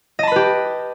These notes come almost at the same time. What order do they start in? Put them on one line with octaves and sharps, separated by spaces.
D#5 A5 B5 B4 G4